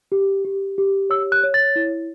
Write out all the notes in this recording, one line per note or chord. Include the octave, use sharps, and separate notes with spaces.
G4
G4
G4
C#5 E6
F#6
C#5
A6
E4